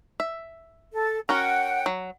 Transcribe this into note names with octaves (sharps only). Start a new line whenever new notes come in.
E5
A4
C#4 F#4 A#4 F#5 G5
F#3